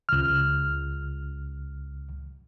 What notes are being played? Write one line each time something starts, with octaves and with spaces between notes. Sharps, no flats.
C#2 F6